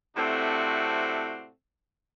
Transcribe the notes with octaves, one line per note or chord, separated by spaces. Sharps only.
A2 C3 A3 C4 D4 F#4